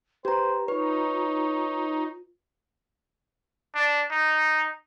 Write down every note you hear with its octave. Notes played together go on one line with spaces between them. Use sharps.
G4 B4 C5 A#5
D#4 F4 B4 C#5
D4
D#4